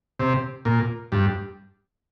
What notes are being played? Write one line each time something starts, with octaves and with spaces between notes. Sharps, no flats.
C3
A#2
G2